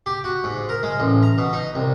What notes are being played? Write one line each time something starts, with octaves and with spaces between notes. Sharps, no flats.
G4
F#4
G#2
A#4
G#3
A1
A#5
B2
D#4
C2